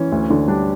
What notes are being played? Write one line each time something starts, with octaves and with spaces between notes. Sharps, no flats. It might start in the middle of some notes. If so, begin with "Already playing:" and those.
Already playing: E3 C#4
D2
D3
G3 D4